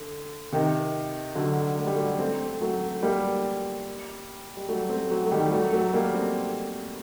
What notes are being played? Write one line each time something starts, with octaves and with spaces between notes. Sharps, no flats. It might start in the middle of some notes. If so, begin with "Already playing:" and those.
Already playing: D3
C3 D#3
D3 F#3
A3
G3
F#3 A3
A3 C4
F#3 A3
G3 A#3
G3
F#3 A3
A3 C4
F#3 A3
A3
D#3 G3
F#3 A3
F#3 A3
G3 A#3
A3 C4